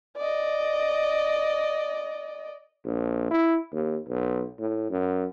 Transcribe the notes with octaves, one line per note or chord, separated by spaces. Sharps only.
D5 D#5
A#1
E4
D#2
B1
A2
F#2